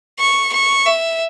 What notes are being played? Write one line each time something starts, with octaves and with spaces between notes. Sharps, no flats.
C#6
C#6
E5